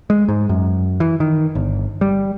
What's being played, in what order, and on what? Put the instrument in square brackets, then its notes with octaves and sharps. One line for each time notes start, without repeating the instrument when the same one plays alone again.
[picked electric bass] G#3
G#2
F#2
E3
D#3
G1
G3